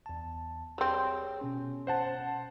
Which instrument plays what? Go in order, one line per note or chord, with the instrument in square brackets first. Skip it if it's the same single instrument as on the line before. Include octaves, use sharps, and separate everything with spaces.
[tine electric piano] E2 A5
[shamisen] G3 C4 [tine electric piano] G#4 C#5 G5
[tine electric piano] B2 C#4
[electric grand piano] C5 F#5 A5